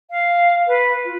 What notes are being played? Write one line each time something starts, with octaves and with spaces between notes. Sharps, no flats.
F5
B4
F4